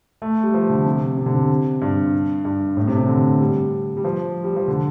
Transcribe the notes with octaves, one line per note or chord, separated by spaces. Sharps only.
A3
G3
F3
D3
C3
C3
D3
C3
G2
G2
A2
C3
C3
D3
G3
G3
F3
G3
F3
D3